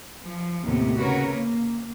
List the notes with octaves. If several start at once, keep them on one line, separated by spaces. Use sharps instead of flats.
F3
D#2 A2 C3 B3
C#3 F#4 A#4 B4 C#5
A#3